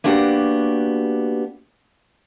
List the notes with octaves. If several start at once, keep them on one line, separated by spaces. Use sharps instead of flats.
A#3 B3 D4 F#4 G4